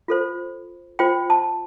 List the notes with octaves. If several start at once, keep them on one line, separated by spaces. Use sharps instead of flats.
F4 A4 C5
F4 C5 G5
A5